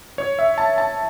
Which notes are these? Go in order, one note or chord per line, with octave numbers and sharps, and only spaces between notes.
C#5
E5
A5
A5